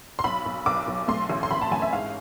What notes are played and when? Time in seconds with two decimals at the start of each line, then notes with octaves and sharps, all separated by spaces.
0.19 C6
0.24 B1 B5
0.45 B1
0.66 B1 D6
0.87 B1
1.08 A3 C6
1.30 A1
1.43 C6
1.51 A1 B5
1.61 A5
1.72 A1 G#5
1.82 E5
1.93 G#2 F5